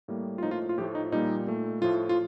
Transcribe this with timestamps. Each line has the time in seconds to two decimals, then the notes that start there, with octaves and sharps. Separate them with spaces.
0.08 A2 G3 A#3
0.38 F4
0.43 A2 F3 A#3 D#4
0.51 F4
0.69 F4
0.78 A2 F3 A3 G4
0.95 D#4
1.12 A#2 G3 A#3 D#4
1.47 A#2 A3
1.81 A2 F3 A3 F4
2.09 F4